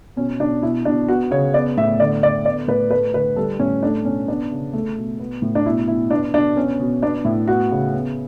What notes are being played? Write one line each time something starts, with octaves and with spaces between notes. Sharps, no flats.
B2 C#4
B2 D4
B2 E4
B2 D4
B3 F#4
C#3 C#5
B3 D5
A2 E5
D3 D5
D3 D5
B3 D5
A2 B4
A3 B4
D3 B4
G3 A4
A2 C#4
A3 D4
B2 C#4
B3 D4
C#3
A3
B2
B3
A2
D4
B2 E4
B2 E4
B3 D4
B2 D4
B3 C#4
B2
B3 D4
A2 E4
B3 F#4
C#3
B3